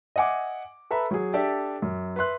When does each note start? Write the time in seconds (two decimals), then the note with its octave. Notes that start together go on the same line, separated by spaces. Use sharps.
0.16 D#5 E5 F#5 G#5 D6
0.91 A4 B4 E5 A#5 B5
1.11 F#3 G#4
1.33 D4 G4 A4 D5 E5
1.82 F#2
2.16 B4 E5 C6 F#6